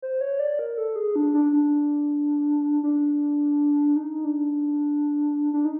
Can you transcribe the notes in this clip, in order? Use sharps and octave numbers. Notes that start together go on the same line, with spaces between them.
C5
C#5
D5
A#4
A4
G#4
D4
D4
D4
D4
D#4
D4
D4
D#4